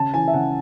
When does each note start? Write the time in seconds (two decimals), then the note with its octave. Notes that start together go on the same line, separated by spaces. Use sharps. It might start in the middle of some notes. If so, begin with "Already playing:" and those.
Already playing: C#3 A5
0.14 E3 G#5
0.28 E5
0.34 C#3 F#5